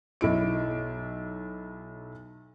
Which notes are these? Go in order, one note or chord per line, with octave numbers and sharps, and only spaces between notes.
B1 E4 D7